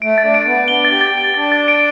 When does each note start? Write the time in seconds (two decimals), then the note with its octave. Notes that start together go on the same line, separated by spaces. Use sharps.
0.02 A3 D7
0.18 A6
0.23 D4
0.34 D7
0.46 B3 D7
0.68 D4 G7
0.85 A6
0.91 G4
1.01 A6
1.17 D7
1.34 D4 A6
1.52 A6
1.68 D7